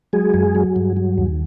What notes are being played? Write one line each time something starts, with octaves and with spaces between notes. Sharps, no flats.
F#3 G#3 G#4
F#2
F#3
G2
F#3
D#2